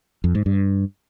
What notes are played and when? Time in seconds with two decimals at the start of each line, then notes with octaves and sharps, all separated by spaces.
0.24 F2
0.35 G#2
0.46 G2